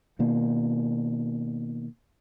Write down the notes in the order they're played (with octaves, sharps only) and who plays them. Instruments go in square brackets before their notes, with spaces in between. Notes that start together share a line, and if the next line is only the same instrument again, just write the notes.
[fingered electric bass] B2 D#3 A#3